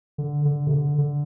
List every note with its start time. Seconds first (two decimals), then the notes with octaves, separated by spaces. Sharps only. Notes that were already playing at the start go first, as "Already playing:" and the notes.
0.18 D3
0.45 D3
0.67 C3
0.71 D3
0.98 D3